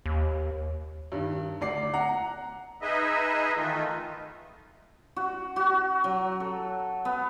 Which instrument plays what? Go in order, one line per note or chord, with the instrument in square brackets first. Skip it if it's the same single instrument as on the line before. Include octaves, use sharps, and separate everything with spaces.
[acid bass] D#2
[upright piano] G2 D#3
D2 D5 C7
F#5 A#5
[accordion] D#4 G#4 B4 D#5 E5
D#3 E3 A3 D#4 F4
[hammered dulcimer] F#4
F#4
F#3
A4
B3